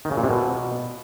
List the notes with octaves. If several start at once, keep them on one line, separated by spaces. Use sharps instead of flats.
D#3
C#3
A#2
C3
B2